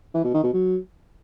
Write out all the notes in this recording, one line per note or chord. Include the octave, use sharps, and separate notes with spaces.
E3
B2
D#3
B2
F#3